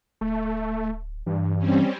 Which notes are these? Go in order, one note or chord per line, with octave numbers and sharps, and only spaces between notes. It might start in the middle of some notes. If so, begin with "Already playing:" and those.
D1 A3
G2 E3
G3 C4 C#4